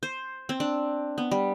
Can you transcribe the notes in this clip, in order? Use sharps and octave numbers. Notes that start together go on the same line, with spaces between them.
C5
C4
D4
B3
G3